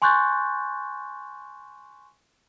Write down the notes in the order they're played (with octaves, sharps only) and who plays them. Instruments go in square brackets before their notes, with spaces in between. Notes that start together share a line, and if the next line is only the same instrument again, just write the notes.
[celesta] G#5 C6 C#6 F#6 G6 A6